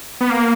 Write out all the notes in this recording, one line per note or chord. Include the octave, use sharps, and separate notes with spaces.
B3
A#3